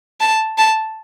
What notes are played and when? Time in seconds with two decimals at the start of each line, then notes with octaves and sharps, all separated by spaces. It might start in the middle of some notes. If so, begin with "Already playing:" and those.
0.21 A5
0.58 A5